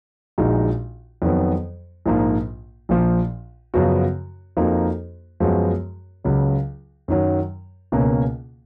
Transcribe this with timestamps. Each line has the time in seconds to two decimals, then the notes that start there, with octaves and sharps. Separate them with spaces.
0.38 A#1 A#2 G#3 D#4 F#4
1.22 F2 D#3 F#3 B3
2.06 A#1 G#2 F3 A#3
2.89 A#1 A#2 F3
3.74 F#2 C#3 F3 B3 F#4
4.57 F2 F3 A#3 D#4 F#4
5.40 F#2 F3 G#3 B3 F#4
6.24 C#2 C#3 F#3
7.08 F#2 D#3 F#3
7.92 C#2 B2 A#3 C#4